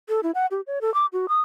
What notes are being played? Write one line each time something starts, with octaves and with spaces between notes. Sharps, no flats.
A4
E4
F#5
G4
C#5
A4
D6
F#4
D#6